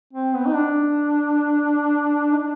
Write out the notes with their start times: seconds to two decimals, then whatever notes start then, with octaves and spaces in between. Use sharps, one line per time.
0.13 C4
0.34 B3
0.45 D#4
0.54 D4
2.32 D#4
2.37 D4